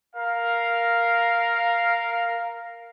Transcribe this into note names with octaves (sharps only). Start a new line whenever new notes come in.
A#4 F5